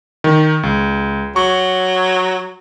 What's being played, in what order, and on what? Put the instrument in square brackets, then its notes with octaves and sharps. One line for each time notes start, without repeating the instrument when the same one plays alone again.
[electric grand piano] D#3 D#4
C#2
[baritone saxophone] F#3 [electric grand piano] C#6